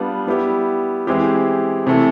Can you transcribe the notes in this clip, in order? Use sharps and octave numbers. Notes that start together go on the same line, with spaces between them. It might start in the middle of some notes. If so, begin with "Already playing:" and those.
Already playing: G3 B3 D4 F4
G3 B3 E4 G4
E3 G#3 C4 E4 G4
C3 E3 A3